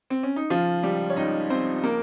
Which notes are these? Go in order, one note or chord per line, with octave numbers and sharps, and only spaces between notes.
C4
C#4
D#4
C#3 F3 F4
C#2 G3 G4
C#5
C#2 D#4 D#5
F3 C4 C5
C#3 A#3 A#4